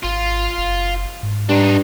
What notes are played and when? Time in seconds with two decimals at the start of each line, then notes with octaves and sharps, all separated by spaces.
0.04 G#1 F4
0.58 F#1
1.23 G#2
1.49 G2 D4 D#4